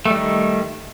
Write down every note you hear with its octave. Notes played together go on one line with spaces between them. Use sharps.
D#3 G3 A3